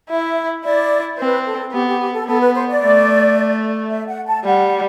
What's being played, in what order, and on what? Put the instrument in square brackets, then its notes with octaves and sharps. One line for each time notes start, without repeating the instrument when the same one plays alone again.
[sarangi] E4 [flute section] E5
[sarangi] E4 [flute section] D5
[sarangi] C4 [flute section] B4
[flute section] A4
[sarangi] B3 [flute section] G4
[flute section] G4
G4
A4
[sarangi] B3 [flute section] A4
[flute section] B4
C5
D5
[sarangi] A3
[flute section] E5
F#5
A5
[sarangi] G3 [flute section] F#5